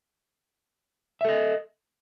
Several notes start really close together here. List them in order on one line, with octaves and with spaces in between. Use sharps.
E5 A4 D#5